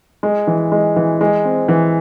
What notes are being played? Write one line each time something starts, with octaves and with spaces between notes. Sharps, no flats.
G#3
E3
G#3
E3
G#3
C4
E3